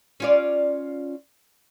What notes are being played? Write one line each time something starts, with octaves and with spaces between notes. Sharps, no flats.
C#4 F4 D5